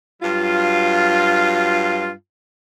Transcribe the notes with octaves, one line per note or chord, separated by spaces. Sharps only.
G2 F#3 F4